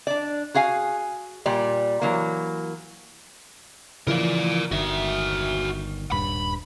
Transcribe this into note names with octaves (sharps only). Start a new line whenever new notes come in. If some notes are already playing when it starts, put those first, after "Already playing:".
D4 D5
F#4 G#4 F5 G#5
A#2 G3 D5
E3 F#3 A#3
C#3 E3 F3 A#4 D5
G1 D#3 F#4 E5
D#1 G2 B5